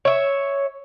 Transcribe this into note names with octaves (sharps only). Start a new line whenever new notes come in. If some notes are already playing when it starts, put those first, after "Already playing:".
C#5 E5